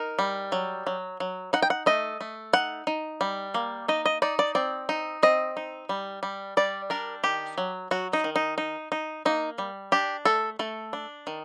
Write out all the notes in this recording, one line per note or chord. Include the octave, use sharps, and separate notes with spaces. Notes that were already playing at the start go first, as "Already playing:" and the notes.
Already playing: D#4 A#4
G3
F#3
F#3
F#3
D#4 F#5
G5
F#5
A3 D#5
A3
D#4 F#5
D#4
G3
A#3
D#4 D#5
D#5
D#4 D5
D5
C4 D5
D#4
C4 D#5
D#4
G3
G3
G3 D5
D4 A#4
D#3 G4
F#3
F#3 F#4
D#4
D#3
D#4
D#4
D#4
A#3 D#4
G3
D4 G4
A3 A4
A3 A4
D4
D#3